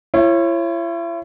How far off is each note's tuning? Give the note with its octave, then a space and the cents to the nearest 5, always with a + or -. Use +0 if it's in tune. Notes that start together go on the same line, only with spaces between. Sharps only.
E4 +40 C#5 -25